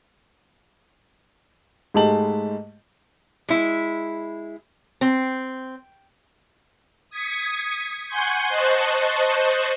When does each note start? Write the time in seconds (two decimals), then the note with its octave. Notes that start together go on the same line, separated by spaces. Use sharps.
1.94 G#2 G#3 A3 G4 A5 F#7
3.49 G#3 E4
5.01 C4
7.10 D#6 G#6 B6 C#7
8.07 F#5 G#5 C6 C#6 G6 G#6
8.49 C5 D#5 A5 C#6 F#6